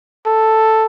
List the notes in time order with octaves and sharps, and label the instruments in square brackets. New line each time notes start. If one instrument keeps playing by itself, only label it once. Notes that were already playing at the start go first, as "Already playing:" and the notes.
[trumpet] A4